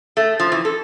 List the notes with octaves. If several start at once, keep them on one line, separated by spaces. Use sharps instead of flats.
A3
F3
E3
A4